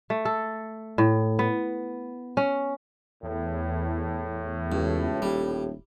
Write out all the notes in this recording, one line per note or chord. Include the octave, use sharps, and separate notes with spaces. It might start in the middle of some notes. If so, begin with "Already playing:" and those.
A3
A4
A2
B3
C#4
E2 A2
C#2 G2
D#1 G3